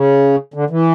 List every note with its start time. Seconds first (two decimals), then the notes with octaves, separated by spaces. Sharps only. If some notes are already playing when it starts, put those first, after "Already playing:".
Already playing: C#3
0.54 D3
0.70 E3